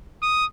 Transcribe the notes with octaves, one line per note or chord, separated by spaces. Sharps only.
D#6